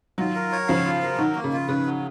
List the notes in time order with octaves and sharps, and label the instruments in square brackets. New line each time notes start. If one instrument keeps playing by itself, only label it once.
[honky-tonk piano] D#3 F#3 [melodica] F4
[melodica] A#4
C#5
[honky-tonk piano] C#3 F3 [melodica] F5
[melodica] F4
A#4
[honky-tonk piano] D#3 [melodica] F#3
[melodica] A#3
[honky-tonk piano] C#3
[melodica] F4
[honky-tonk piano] C#3 [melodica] B4
[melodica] F#3